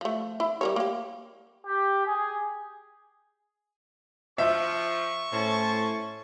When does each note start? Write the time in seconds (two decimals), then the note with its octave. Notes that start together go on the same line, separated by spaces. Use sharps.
0.01 F3 A3
0.40 E4
0.61 G3 A#4 C#5
0.76 A#3 G4
1.66 G4
2.07 G#4
4.38 F3 E5 C#6
5.33 A2 C#4 C5 A5